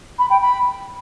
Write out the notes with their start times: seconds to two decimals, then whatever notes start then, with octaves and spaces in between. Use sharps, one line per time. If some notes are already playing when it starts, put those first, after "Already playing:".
0.19 B5
0.30 G5
0.41 B5